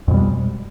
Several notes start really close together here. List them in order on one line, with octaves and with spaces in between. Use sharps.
F2 B2 G3 G#3